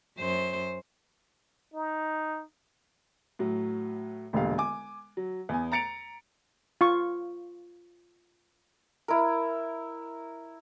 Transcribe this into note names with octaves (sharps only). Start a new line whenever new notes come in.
F#2 C5
D#4
A2 F#3
E1 A#1 D3 G4 F5
G#5 D6
F#3
E2 G#5
A#5 A6 C#7 D7 F7
F4 C#6
E4 A#4